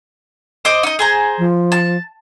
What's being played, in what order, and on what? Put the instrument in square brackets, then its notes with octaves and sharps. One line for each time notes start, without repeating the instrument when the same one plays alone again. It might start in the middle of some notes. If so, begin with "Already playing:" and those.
[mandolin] C5 D#5 D6
D#4 D#5
G#4 C5 A#5
[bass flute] F3
[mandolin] A5